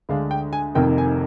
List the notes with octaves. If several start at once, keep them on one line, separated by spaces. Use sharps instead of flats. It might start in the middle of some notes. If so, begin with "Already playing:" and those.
D2 D3 G#3 D4 F5
G5
G#5
F1 F2 C3 D#3 A#3 G5
G#5